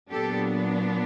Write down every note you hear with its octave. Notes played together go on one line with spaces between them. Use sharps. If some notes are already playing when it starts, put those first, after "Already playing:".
A#2 F#3 B3 D4 G4 A4